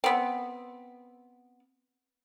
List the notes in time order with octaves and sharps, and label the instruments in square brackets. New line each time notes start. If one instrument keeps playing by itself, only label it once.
[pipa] B3 C4